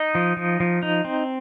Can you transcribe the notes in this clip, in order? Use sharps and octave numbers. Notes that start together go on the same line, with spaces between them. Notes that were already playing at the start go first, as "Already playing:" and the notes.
Already playing: D#4 D#5
F3
F3
F3
D#4
C4